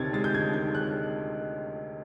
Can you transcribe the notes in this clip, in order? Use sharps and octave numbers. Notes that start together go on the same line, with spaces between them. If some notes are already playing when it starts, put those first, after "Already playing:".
Already playing: D2 C3 D#3 G#6 A6
G#3 A6
G6
D2 G#6
D#3 G6
G#3 F#6